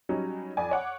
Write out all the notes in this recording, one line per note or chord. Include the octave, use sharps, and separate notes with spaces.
F#3 G3 C#4 D#4
F2 D5 G#5
C#5 F#5 D6